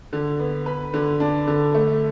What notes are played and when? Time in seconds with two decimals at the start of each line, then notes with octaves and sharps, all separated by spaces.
0.13 D3
0.39 B3
0.66 B4
0.94 D3
1.20 D4
1.47 D3
1.74 A3